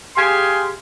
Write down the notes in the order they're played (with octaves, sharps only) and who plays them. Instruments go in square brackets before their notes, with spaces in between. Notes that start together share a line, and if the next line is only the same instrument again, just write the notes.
[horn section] G4 G#4 F5 G#5 C6